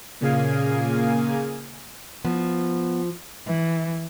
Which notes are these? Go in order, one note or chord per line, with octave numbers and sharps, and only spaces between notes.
A#2 C#3 A#3 G#4 F5 G#5
F3 B3
E3